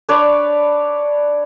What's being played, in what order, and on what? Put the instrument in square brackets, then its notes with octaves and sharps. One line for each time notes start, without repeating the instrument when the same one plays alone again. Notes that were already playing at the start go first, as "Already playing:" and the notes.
[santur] D4 B4 C#5 D5